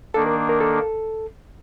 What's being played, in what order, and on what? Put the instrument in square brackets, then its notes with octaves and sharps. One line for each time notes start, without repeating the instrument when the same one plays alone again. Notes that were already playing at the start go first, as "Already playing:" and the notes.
[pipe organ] D#3 A#3 D4 [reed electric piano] A4
[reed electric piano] A#4
A#4
A4